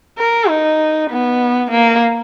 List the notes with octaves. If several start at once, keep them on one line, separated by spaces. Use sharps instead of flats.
A#4
D#4
B3
A#3